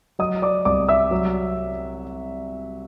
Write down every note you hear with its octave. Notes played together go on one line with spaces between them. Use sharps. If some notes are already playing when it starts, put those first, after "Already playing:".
F#3 D#5 D#6
D5 D6
C2 D5 D6
E5 E6
F#3